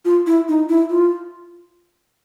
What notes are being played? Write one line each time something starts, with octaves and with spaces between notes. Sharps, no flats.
F4
E4
D#4
E4
F4